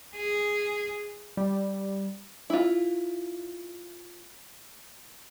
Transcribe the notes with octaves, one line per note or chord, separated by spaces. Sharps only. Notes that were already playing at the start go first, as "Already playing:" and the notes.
G#4
G3
E4 F4